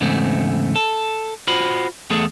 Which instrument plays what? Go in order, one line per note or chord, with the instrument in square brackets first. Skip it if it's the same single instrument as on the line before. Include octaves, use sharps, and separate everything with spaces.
[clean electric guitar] E2 G#2 C#3 A3 C4
A4
F4 F#4 C5 B5
E2 A3 G#4 A4